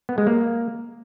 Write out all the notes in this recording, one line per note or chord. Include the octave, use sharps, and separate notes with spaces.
B3
G#3
A#3